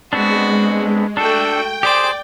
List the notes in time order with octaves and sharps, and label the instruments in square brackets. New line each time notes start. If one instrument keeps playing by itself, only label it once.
[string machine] G#3 [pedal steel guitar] B3 C4 D4 [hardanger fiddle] F#4
[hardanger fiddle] A3 F#4 [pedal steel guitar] D4 A4 [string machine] G5
[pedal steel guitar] G4 G#4 C5 [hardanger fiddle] D5 D6